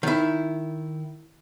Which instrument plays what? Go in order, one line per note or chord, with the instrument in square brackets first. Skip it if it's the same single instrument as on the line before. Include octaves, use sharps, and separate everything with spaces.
[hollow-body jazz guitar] D#3 E4